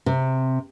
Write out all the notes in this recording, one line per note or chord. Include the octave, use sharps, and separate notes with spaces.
C3